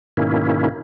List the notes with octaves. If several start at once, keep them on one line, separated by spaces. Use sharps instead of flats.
G#2 B2 D#3 A#3 C#4 E4